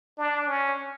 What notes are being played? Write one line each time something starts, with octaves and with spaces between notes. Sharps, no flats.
D4
C#4